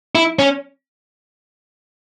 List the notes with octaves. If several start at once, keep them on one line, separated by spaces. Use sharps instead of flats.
E4
C#4